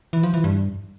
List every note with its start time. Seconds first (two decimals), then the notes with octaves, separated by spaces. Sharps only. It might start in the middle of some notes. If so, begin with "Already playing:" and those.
0.13 E3
0.23 F3
0.34 E3
0.44 G2